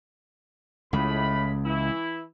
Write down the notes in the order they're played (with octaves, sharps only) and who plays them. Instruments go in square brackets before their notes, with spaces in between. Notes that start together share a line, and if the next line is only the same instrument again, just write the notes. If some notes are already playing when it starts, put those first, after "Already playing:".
[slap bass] C#2 C#3 [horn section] A2 B5
[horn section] E3 E4